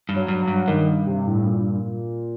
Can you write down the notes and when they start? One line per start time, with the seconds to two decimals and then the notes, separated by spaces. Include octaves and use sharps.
0.09 G2
0.16 F#3
0.28 G2
0.42 F#3
0.48 G2
0.68 G2 D#3
1.07 C3
1.27 A2
1.46 A#2